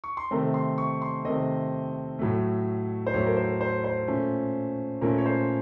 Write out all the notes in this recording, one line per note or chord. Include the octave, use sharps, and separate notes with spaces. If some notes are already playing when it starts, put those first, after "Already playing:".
C#6
C6
C3 D#3 A3 C4 A#5
C6
C#6
C6
C3 D#3 A3 C4 D#5
A2 F#3 A3
C5
A2 F#3 A3 C#5
A#4
C5
C5
C5
A#2 A3 C#4
A#2 A3 C#4 A#4
C#5
C5